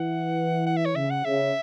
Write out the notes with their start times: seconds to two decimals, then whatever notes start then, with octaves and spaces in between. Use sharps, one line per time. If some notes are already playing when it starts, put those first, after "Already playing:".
Already playing: E3 F#5
0.66 F#5
0.76 E5
0.85 C#5
0.95 C#3 E5
1.10 F#5
1.25 C#3 E5